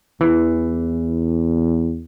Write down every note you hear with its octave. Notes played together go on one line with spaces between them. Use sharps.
E2 E3